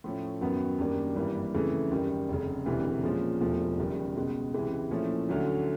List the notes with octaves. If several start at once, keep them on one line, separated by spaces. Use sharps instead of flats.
A2 F3 A3 C#4
F#2 D#3 F#3 B3
F#2 D#3 G3 A#3 D4
G#1 G2 E3 G3 A#3
F2 C#3 E3 A3
F#2 D#3 G3
F1 F2 C#3
E1 D2 C3 E3
A#2 F3 G#3 C#4 F4
E1 E2 C3 F3 A3
F#1 F#2 D#3 G3
C#2 B2 G#3
C#2 C3 E3 G#3
A#2 F3 A3 C#4 E4
D2 D3 F#3 A3 C#4